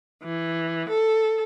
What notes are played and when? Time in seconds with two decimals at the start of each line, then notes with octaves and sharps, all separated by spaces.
0.23 E3
0.88 A4